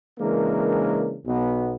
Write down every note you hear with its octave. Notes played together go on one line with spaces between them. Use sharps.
C#3 E3 G#3 A#3 D4 A#4
B1 B2 F#3 B3